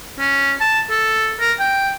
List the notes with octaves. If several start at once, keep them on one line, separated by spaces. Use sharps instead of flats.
C#4
A5
A4
A#4
G5